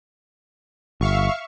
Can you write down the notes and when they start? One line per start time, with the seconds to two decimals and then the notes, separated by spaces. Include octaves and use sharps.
1.01 G1 E5 F5 C#6